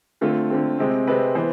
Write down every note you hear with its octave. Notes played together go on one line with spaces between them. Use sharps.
D3 A3 C4 F4
D3 A3 C4
C3 G#3 C4
C3 G#3 C4 B4
E3 B3 C5